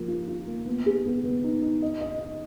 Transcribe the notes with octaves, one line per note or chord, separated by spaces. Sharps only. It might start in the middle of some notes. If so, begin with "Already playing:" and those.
Already playing: F3 A#3 A#4
F4
F4
A#3
B3
G#4
B3
B3
D#4
D#4
D#5
D#5
D#5